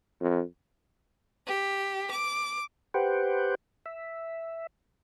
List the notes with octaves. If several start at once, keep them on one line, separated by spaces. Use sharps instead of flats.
F2
G4
D6
G4 B4 C5 F#5 G5
E5